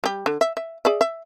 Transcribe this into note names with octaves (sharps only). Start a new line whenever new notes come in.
G3 G4
D3
E5
E5
G#4 D5 E5
E5